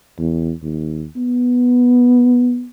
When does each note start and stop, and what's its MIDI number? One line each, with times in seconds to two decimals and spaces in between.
0.19 0.52 40
0.63 1.05 39
1.16 2.68 59